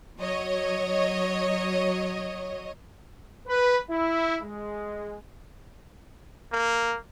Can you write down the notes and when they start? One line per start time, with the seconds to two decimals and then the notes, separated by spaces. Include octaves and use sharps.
0.19 F#3 C#5 D#5
3.47 B4
3.90 E4
4.42 G#3
6.52 A#3